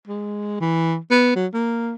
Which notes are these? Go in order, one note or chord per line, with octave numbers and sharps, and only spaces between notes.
G#3
E3
B3
F#3
A#3